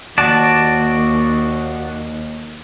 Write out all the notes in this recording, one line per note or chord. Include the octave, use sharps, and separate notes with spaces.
D#2 F#4 D5 A5